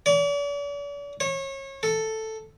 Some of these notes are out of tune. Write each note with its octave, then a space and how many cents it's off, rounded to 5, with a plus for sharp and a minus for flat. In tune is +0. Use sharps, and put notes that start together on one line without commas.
D5 -45
C#5 -30
A4 +5